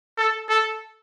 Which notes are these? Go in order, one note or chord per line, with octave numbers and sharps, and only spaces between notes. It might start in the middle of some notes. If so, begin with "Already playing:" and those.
A4
A4